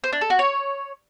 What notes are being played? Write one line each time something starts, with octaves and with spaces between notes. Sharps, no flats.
C5
D4
A4
F#4
C#5